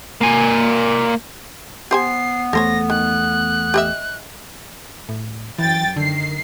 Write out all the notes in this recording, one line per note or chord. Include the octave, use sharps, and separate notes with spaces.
A#3 G#5
B3 G4 C5 G#5 C7
E2 A3 A4 C5 C#5 A#6
D#3 F#6
G4 D#5 E5
A2
F#2 E3 G5 A6
D3 D#3 C7